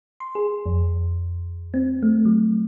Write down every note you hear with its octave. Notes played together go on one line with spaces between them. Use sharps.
C6
G#4
F2
C4
A3
F#3